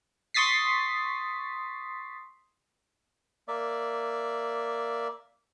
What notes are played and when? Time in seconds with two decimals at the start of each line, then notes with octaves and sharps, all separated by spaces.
0.34 C6 C#6 D#6 A6 B6 C7
3.48 A#3 D5 E5